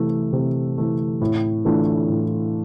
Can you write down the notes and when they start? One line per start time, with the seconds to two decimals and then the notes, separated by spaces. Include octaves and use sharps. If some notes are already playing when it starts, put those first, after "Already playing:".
Already playing: C3 E3 A3
0.33 C3
0.78 E3 A3
1.21 A2
1.65 E3 A3 D4 F4
2.09 A2